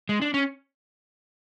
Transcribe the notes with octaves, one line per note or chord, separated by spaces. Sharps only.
G#3
D4
C#4